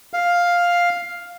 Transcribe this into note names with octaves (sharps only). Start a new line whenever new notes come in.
F5